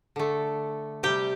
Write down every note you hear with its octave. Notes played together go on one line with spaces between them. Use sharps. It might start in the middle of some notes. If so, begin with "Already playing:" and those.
D3 A3
C3 G3 G4 G5